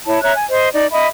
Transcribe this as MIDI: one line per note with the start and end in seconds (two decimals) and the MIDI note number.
0.07 0.20 64
0.07 0.20 73
0.07 0.20 81
0.23 0.34 73
0.23 0.34 76
0.23 0.34 82
0.23 0.34 90
0.35 0.45 80
0.49 0.69 72
0.49 0.69 75
0.73 0.86 63
0.73 0.86 74
0.92 1.07 75
0.92 1.07 76
0.92 1.07 83